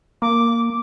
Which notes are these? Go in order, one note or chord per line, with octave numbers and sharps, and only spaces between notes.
A#3 D6